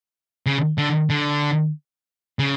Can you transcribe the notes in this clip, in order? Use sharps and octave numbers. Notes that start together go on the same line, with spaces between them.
C#3
D3
D3
C#3